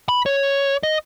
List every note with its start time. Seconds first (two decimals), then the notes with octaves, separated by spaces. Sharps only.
0.09 B5
0.26 C#5
0.83 D#5